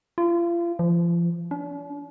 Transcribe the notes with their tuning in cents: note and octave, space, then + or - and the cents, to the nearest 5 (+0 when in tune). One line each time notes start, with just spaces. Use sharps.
F4 -35
F3 -35
D4 -45